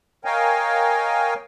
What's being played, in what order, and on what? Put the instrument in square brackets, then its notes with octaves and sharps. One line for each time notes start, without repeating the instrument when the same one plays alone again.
[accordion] A#4 C#5 D#5 F5 G5 G#5